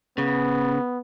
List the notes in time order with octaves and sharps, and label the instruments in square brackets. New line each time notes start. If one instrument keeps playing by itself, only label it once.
[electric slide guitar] C#3 [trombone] B3